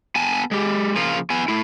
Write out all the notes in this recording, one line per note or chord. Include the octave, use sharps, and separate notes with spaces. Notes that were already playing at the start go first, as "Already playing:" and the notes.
B3 G#5 A5
G#3 G4
C#3 F3 A#3 F4
B3 G#5
A3 E4